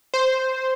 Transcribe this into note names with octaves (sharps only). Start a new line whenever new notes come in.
C5